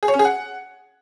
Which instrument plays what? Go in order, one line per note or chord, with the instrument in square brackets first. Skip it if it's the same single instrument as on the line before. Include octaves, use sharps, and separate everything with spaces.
[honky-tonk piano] G#4
C#5
C#4
G#4
F#5